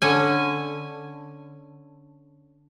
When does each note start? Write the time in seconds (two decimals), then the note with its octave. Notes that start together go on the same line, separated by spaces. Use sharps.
0.02 D3 C#4 G#5